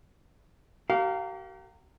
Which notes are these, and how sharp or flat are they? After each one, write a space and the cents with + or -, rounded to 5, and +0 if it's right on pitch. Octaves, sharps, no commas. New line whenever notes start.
G4 -45 A#4 -20 F5 +0